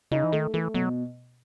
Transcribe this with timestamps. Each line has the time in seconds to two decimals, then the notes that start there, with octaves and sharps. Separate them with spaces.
0.11 C#3 D#4
0.24 E3
0.33 D#3 A3
0.54 E3 A3
0.74 B2 F#3